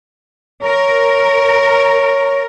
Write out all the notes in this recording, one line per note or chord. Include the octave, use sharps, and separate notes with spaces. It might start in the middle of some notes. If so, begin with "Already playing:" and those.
A#4 C#5